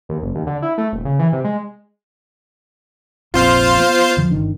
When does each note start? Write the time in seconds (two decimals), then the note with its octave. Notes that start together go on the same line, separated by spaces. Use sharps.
0.09 D#2
0.22 F#1
0.35 D#2
0.47 D3
0.62 E4
0.78 A3
0.93 D#1
1.05 C#3
1.19 E3
1.32 C3
1.44 G#3
3.34 F1 A#1 C4 F4 C5 F5
3.80 B3
4.17 E2 D3 F3
4.31 G1 D#3 D4